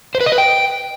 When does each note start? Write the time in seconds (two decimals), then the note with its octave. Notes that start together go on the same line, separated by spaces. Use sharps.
0.15 C5
0.21 B4
0.26 D#5
0.32 B4
0.38 G5